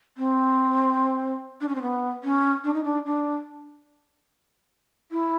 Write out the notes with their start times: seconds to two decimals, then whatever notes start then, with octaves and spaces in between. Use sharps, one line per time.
0.18 C4
1.61 D4
1.68 C#4
1.75 C4
1.82 B3
2.24 C#4
2.64 D4
2.74 D#4
2.84 D4
3.06 D4
5.11 E4